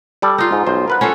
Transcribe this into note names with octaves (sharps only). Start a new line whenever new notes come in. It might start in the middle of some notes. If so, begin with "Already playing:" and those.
G3 A4 D5
D#4 F4
G#2
B1 C5
A#4 B4 F#5
C#4 F4 A4